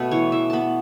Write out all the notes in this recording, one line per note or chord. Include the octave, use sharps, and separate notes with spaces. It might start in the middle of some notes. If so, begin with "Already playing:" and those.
Already playing: B2 A3 B4
E3 C#5
E3 E5
B3 A5 B5